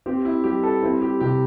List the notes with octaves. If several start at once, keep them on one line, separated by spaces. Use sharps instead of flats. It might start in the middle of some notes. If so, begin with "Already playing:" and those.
C4 G4
E4
G3 G4
A4
C4 E4
G4
C3 G4